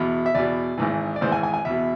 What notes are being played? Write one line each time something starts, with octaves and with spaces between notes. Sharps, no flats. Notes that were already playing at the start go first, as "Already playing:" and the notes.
Already playing: E2 B2
E5
E2 B2 D5
G#1 G#2 E3
D5
G#1 G#2 E3 C5
G#5
G#5
G#5
E2 B2 E5